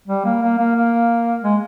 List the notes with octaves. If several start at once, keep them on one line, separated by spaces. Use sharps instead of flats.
G3
A#3
A#3
A#3
A#3
G#3